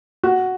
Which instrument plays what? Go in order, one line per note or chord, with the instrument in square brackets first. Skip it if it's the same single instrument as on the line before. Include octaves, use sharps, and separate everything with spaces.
[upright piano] F#4